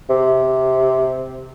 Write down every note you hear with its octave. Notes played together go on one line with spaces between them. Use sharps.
C3